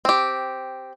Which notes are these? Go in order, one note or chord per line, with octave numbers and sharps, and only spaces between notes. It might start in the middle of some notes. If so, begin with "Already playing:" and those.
C4 G4